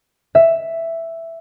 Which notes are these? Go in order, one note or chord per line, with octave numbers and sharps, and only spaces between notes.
E5